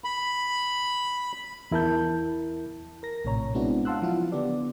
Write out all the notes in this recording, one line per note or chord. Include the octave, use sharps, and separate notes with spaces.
B5
E2 E4 A#4 A5 G6
A#4 A#6
A#1 A2 C3 C#5 A#5
G#3 B3 C4 D4 E4 F#4
F5 F#5 A5 C6 E6 F#6
F3 F#3 E4 F4
D3 B3 G4 D5